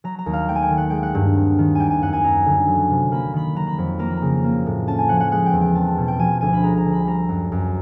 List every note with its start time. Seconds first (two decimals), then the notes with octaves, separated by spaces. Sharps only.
0.04 F#3 A#5
0.19 A#5
0.26 D#2
0.33 F5
0.48 A3 G5
0.55 G#5
0.62 G5
0.70 D#3
0.78 F#5
0.90 G#3 G5
1.03 F#5
1.15 G2
1.35 C4
1.59 D#3
1.75 G3 G5 G#5
1.90 G#5
2.02 F#2 F#5
2.13 G#5
2.24 F#2 A#5
2.46 D3
2.67 F#3
2.90 C3
3.12 A#3 B5
3.34 D#3 B5
3.55 F#3 A#5
3.67 B5
3.78 F2
3.99 A#3 A#5
4.09 B5
4.17 C#3 A#5
4.44 A#3
4.66 A2
4.87 C#4 A5
4.98 G#5
5.09 F3 F#5
5.20 F#5
5.31 G#3 F#5
5.46 G5
5.53 E2
5.61 G5
5.75 C4 A5
5.98 B2
6.08 G5
6.19 F3 G#5
6.41 D2 G#5
6.53 B5
6.63 G#3 A#5
6.77 A#5
6.85 D3
6.93 B5
7.07 G3 A#5
7.29 F#2
7.52 F#2